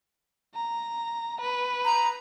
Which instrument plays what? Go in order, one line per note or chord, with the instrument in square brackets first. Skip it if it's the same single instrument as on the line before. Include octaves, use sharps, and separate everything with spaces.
[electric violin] A#5
B4
[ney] A#5